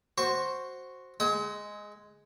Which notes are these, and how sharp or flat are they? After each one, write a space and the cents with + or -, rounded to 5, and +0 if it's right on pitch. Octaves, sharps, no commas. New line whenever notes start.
F#4 +0 C5 +5 C#6 +0
G#3 +0 F#5 +40 D#6 +45